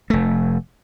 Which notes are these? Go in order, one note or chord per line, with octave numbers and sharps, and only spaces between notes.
F1 A3